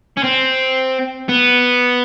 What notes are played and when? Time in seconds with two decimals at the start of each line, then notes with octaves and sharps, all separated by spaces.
0.17 C#4
0.23 C4
1.29 B3